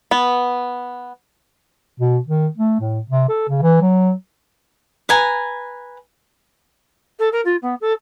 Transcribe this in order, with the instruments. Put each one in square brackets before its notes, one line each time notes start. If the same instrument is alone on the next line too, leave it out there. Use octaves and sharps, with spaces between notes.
[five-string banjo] B3
[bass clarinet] B2
D#3
A3
A2
C3
A4
C#3
E3
F#3
[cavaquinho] B4 G#5 A#5
[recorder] A4
A#4
F4
B3
A4